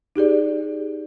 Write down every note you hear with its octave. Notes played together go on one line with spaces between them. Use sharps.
D#4 G4 G#4 D5